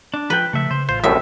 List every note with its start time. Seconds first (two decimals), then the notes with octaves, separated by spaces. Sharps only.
0.14 D4
0.30 F3 B4 G5
0.53 C#3 F3 A3 E5
0.71 C#3 C5
0.89 A1 F4 C5
1.04 C2 F#2 A2 E5